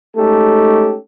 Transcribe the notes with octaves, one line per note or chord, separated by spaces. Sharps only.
G#3 A3 C#4 D#4 G4 A4